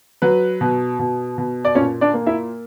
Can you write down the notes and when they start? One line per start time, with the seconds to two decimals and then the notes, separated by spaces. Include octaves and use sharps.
0.22 F#3 B4
0.61 B2
0.99 B2
1.38 B2
1.65 D5
1.75 A#2 C#4 C#5
2.01 D4 D5
2.14 A#3
2.27 E4 E5